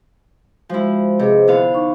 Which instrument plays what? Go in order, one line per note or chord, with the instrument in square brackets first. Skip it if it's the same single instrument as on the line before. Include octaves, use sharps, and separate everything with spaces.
[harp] F3 E4 [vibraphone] G#3 F#4 C5
[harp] C3 [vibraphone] G#4 B4 D#5
[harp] D3 B3 F5 [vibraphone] E4
[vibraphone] D#4 C#6